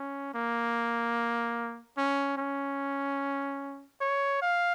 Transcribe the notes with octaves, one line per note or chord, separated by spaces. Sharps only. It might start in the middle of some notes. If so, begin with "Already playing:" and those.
Already playing: C#4
A#3
C#4
C#4
C#5
F5